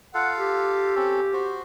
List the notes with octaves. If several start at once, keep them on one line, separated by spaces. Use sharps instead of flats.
F4 A4 F5 F#5
G4
C4 C#4 A4
F#4 C5